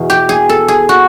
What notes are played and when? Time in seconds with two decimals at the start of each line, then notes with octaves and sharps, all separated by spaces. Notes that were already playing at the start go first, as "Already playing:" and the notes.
Already playing: E2 B2
0.10 G4
0.29 G#4
0.49 A4
0.68 G#4
0.89 F#4